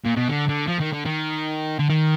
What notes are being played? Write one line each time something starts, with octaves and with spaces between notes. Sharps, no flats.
A#2
B2
D3
D3
F3
D#3
D3
D#3
D3
D#3